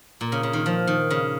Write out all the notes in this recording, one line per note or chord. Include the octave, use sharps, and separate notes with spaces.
A#2
C#3
C#3
D#3
F3
D#3
C#3